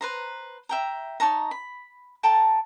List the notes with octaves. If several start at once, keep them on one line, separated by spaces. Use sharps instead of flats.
B4 C5 A#5
E5 G5 A#5
D#4 C#5 A5 A#5
B5
A4 G5 A5 A#5